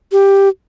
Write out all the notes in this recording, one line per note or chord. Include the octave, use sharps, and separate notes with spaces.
G4